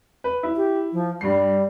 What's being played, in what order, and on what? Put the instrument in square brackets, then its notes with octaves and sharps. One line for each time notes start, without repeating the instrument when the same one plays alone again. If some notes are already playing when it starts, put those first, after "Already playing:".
[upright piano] B4
E4
[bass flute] G4
F3
[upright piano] G2 C7 [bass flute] G3